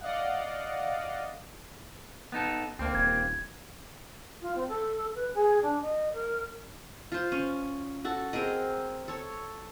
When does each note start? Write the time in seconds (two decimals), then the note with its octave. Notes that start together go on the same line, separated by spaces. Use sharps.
0.01 D5 D#5 F5 F#5
2.32 B3 D#4 A4
2.79 D2 A#3 C4
2.95 D#1 G#6
4.42 F4
4.55 C4
4.68 A4
5.15 B4
5.35 G#4
5.62 D4
5.81 D#5
6.13 A#4
7.12 F4 C5
7.32 C#4
8.05 F#4 A4
8.33 C4 G#4 A#4 D#5
9.08 A4 C#5